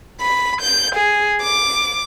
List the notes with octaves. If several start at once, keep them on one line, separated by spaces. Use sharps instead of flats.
B5
G6
G#4
D6